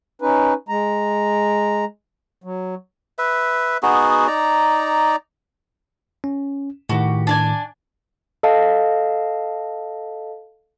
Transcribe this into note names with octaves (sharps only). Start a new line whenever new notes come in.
C#4 D#4 B4
G#3 A#5
F#3
B4 E5
B3 D#4 F#4 G#4
D#4 D5 A#5
C#4
A2 D#3 F#4 G4
D4 D5 G#5
A4 D#5 F5 A5